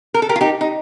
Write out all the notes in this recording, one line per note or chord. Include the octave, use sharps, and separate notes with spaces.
A#4
A4
G4 A#4
F4
D#4 G4
D#4